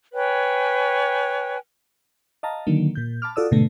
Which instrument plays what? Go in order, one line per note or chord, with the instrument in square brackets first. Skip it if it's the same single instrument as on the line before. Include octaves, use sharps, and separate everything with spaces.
[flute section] B4 C#5 G5 G#5
[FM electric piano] D#5 F5 A5 A#5
D3 D#3 F#3 A#3
A#2 G6
A5 B5 D6 F6
F4 F#4 A4 D5 D#6 E6
G#2 B2 D3 A3